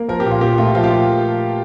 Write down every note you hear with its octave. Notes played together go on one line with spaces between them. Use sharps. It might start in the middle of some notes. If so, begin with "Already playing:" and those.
Already playing: A#3
F3 A#4
G4
A#2
F4
A#2 G4
A3 F4
F3 F4
G4